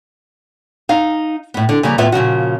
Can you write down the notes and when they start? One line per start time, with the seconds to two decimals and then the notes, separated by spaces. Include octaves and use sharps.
0.89 D#4 F5
1.54 A2 B3
1.69 D3
1.83 C#3 F3 G3 A#3
1.98 D#2 A2 B3 F4 B4 E5
2.12 A#2 C#3 F3 F#4